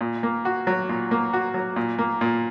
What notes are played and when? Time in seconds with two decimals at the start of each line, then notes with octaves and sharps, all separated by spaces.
0.01 A#2
0.23 A#3
0.45 F#4
0.67 F#3
0.89 A#2
1.11 A#3
1.33 F#4
1.54 F#3
1.76 A#2
1.98 A#3
2.21 A#2